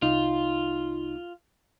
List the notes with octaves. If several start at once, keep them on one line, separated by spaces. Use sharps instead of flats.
C2 D#4 F4